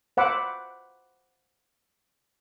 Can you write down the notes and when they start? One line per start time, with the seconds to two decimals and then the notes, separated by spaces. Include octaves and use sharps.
0.17 C5 F#5 B5 D6 E6